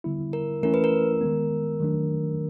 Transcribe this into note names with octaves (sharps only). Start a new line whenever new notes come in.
D3 G3 B3 E4
A#4
E3 A3 C#4 E4 A#4
B4
A#4
D#3 G#3 B3
D#3 F#3 A3 D4